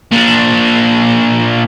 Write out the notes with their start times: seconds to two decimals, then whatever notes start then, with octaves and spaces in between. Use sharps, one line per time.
0.11 A#2 D4